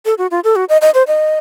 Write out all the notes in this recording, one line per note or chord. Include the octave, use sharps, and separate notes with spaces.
A4
F#4
F4
A4
F#4
D#5
D#5
C5
D#5